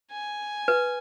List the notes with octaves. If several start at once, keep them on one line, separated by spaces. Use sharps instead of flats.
G#5
B4